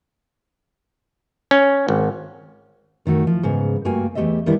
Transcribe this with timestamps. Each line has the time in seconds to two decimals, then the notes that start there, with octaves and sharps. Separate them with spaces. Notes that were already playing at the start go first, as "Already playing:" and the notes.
1.51 C#4
1.89 G#1
3.06 F#2 D#3 A3 F#4
3.27 F3
3.43 G#2 C#3 B3
3.85 G2 A3 A#3 F#4 G5 G#5
4.15 E2 G#3 A3 G4 D#5 E5
4.46 D#3 G3 B3 D4 E4